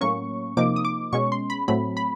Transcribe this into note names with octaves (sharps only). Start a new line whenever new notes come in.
A2 F#3 A#3 C#4 C#6
C3 F3 A#3 D#4 D6
D#6
D6
B2 G#3 C#4 C#6
C6
B5
A2 F#3 A3 C4 B5
B5